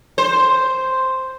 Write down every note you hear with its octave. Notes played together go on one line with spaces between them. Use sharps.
C5